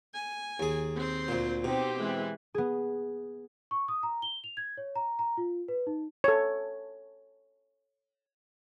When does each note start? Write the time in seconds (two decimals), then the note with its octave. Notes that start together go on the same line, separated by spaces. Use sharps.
0.14 G#5
0.60 D#2 G#4
0.96 C4 C5
1.28 D2 A#2
1.64 B2 C4 D#4 G4
1.98 E3 G#3
2.54 B3 G#4
3.71 C#6
3.88 D#6
4.03 A#5
4.22 G7
4.44 F7
4.57 G#6
4.77 C#5
4.95 A#5
5.19 A#5
5.37 F4
5.68 B4
5.87 D#4
6.24 A4 C#5